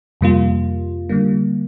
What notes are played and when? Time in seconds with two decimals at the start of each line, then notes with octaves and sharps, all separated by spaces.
0.21 F2 C3 G3 A#3 F4
1.09 D3 G3 A#3